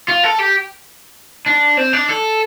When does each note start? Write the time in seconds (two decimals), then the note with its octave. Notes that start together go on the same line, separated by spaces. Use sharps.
0.08 F4
0.24 A4
0.39 G4
1.46 D4
1.77 C4
1.93 D4
2.09 A4